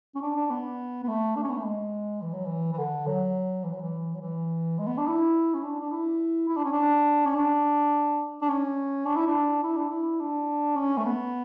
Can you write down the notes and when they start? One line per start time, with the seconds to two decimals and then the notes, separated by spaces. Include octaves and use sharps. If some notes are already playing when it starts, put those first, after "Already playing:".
0.15 C#4
0.22 D4
0.36 D4
0.50 B3
1.03 B3
1.08 A3
1.36 D4
1.43 C#4
1.50 B3
1.57 A3
1.64 G#3
2.21 E3
2.33 F#3
2.46 E3
2.73 E3
2.78 D3
3.07 F#3
3.64 E3
3.73 F#3
3.82 E3
4.14 F#3
4.21 E3
4.78 G#3
4.87 B3
4.98 D4
5.07 E4
5.54 C#4
5.63 D4
5.80 D4
5.91 E4
6.49 E4
6.56 D4
6.65 C#4
6.72 D4
7.25 C#4
7.34 D4
8.41 D4
8.48 C#4
9.05 D4
9.16 E4
9.27 D4
9.63 E4
9.76 D4
9.89 E4
10.20 D4
10.76 C#4
10.97 A3
11.05 B3